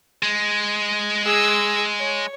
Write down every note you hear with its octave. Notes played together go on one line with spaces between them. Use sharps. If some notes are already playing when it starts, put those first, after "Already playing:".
G#3
G#4 E6
C#5